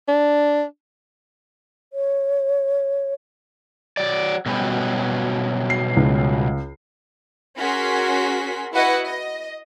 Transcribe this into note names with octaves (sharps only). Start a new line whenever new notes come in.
D4
C#5
F#3 D5
B2 F#3 G3
C7
C#2
C#4 F#4 G#4 A#4 C6 B6
E4 F#4 B4 D#5 F#5
D#5